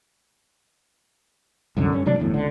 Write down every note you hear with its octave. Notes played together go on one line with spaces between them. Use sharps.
C2 F#2 D3
G2 C#4
D2 C3 F#3 D4
G1 E2 A2
C#2 D3